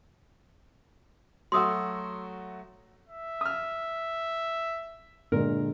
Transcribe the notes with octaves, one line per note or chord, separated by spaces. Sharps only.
F#3 A3 F#4 C6 D#6 E6
E5
D#6 F6
A#2 D3 G#3 A#4